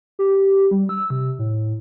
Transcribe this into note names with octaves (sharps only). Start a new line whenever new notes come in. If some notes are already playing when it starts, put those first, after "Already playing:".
G4
G3
E6
C3
A2